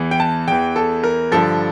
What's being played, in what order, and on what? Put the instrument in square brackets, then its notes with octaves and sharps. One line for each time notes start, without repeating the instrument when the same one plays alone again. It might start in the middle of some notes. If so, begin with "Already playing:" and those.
Already playing: [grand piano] E2 E3
G5
A5
E2 E3 G5
A4
A#4
G2 D3 F3 A4